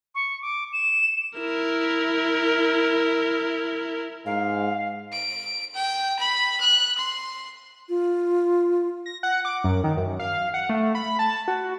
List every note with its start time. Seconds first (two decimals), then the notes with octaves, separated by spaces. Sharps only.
0.15 C#6
0.42 D6
0.73 E7
1.38 E4 A#4
4.26 G#2 F5
5.12 D7
5.75 G5
6.19 B5
6.61 F#6
6.98 C6
7.89 F4
9.06 A#6
9.23 F#5
9.45 D6
9.64 F#2
9.84 D#3
9.97 F#2
10.20 F5
10.54 F#5
10.69 A3
10.95 B5
11.19 A5
11.48 F#4